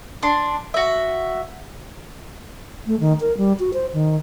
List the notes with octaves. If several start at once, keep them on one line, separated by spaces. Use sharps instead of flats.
D4 C6
F#4 E5
A3
D#3
A#4
G3
F#4
C5
D#3